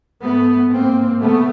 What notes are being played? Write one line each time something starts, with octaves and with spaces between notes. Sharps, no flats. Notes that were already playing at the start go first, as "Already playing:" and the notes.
G#2 A3 B3
G#2 A#3 C4
C#3 A3 B3